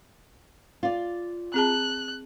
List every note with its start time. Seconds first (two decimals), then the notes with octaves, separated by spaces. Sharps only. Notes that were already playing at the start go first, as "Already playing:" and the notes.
0.83 F4 D5
1.54 C4 G#4 A5 F#6